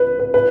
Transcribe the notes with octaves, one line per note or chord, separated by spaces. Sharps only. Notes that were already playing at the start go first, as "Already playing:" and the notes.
Already playing: B4
B4
B4